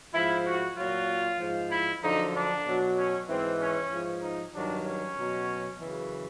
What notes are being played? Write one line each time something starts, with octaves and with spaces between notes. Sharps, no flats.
G#2 F3 E4
F#4
A#2 F#3 F4
G#2 F3
E4
F#2 D3 F3 D#4
D4
B2 F#3
C#4
G#2 E3 C4
C#4
G#2 F3
D#4
G2 D#3 F#3 D4
C#4
B2 F#3
F#2 C#3 E3